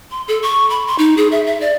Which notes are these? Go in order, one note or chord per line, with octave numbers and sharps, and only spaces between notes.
C6
A4
C#6
B5
C6
D#4
G#4
E5
E5
D5